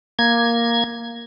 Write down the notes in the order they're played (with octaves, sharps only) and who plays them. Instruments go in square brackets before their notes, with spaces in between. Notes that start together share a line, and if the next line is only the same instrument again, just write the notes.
[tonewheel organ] A#3 G#6